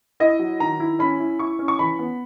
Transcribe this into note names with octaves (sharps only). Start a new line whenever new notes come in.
E4 D#5
F#3
D#3 A#5
E4
C#4 B5
E4
E4 C#6
C#4
C#6
E3 B5
B3